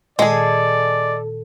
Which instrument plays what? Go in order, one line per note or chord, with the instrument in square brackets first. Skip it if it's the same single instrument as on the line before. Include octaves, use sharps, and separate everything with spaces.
[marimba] A#2 D#3 [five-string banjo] G#3 G#4 [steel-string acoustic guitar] A4 [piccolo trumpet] D5